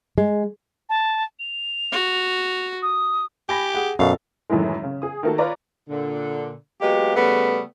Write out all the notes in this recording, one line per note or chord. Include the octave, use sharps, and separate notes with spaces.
G#3
A5
F7
F#4
D#6
G4 G#5 B5 A#6
G#4 F#5
F#2 B2 A4 F5
F#2 A2 D#3 E3 G#3
C#3
G#4 D#6
D#3 A3 A#3 F#4 A4
F4 B4 C#5 D5 A#5
A#2 D3
F#3 G#3 A#3 B3 G4
C#3 G3 A3 B3